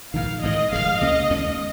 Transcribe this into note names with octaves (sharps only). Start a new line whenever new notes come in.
A#1 G#2 D#3 F5
G#1 G#2 D#3 D#5
F1 D#2 D#3 G#3 F5
C#2 C#3 A#3 C#4 D#5
D#2 D#3 G#3 C#4